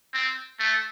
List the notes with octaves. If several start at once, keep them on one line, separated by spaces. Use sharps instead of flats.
C4
A3